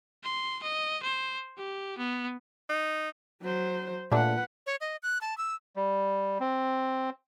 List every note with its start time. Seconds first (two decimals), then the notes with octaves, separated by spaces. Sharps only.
0.24 C6
0.63 D#5
1.03 C5
1.58 G4
1.98 B3
2.70 D#4
3.42 F#3 C5
4.12 A#2 A3 D4 B4 F#5
4.67 C#5
4.81 D#5
5.03 F#6
5.21 A5
5.38 E6
5.76 G3
6.40 C4